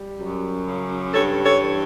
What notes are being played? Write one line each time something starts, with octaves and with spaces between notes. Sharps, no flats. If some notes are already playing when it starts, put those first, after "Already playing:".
Already playing: G3
F#2
C#3
G2 A4 C#5
A4 C#5
E3